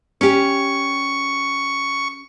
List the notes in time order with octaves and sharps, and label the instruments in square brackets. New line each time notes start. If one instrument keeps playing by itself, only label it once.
[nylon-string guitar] C#4 G4 [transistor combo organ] C#6